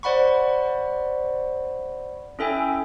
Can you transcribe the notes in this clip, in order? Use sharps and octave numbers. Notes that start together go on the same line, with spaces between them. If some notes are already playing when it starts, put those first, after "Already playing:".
C5 D5 F#5 B5 C#6
C#4 E4 A4 E5 G5 G#5